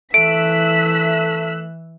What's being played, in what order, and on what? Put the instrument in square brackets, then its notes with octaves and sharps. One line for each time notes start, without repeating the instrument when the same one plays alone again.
[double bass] E3 [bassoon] A3 [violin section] E6 F#6 B6 [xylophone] D7